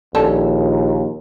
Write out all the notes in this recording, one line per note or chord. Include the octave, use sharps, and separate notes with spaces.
A#1 D#2 G3 C#4 A4